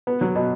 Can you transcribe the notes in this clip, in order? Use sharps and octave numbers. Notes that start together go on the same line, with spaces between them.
B3
F#3
B2